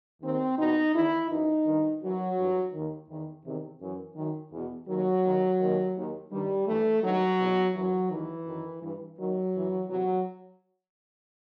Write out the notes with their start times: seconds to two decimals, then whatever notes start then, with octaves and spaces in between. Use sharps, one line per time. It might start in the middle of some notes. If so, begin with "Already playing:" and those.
0.22 D#2 D#3 C4
0.58 E2 B2 D#4
0.94 E2 D#3 E4
1.30 F#2 E3 D#4
1.66 G2 D#3
2.02 F#2 E3 F#3
2.37 G2 E3
2.73 D#2 D#3
3.09 E2 D#3
3.45 E2 C3 D#3
3.81 F#2 E3
4.16 F#2 D#3
4.52 E2 B2
4.88 D#2 D#3 F#3
5.24 D#2 D#3
5.59 D#2 D#3
5.96 D#2 D#3
6.31 G2 D#3 G3
6.67 G2 E3 A3
7.03 G2 D#3 F#3
7.39 E2 B2
7.74 F#2 E3 F#3
8.10 D#2 D#3 E3
8.46 F#2 D#3
8.82 G2 E3
9.17 D#2 D#3 F#3
9.53 F#2 E3
9.89 E2 C3 E3 F#3